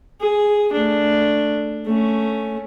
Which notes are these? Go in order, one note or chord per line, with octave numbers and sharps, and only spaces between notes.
G#4
A3 D4
A3 C#4